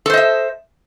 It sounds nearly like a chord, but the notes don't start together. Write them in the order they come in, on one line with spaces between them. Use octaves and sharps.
A4 C5 D#5 E5